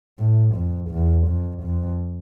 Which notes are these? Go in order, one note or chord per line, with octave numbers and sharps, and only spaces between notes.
A2
F2
E2
F2
F2